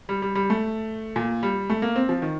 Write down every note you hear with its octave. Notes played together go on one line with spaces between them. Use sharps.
G3
G3
G3
A3
A#2
G3
A3
A#3
C4
F3
D#3